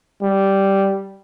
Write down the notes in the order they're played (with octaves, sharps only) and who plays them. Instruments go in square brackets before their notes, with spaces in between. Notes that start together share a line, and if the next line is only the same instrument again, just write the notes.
[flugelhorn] G3